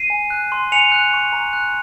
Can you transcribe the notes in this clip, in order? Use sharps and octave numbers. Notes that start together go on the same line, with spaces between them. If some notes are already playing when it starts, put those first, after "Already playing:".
Already playing: C7 D#7
G#5
F#6
C6
G#5 C#7 F7
F#6
C#6
A#5
F#6